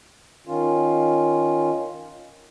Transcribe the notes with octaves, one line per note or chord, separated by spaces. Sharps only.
D#3 C#4 F4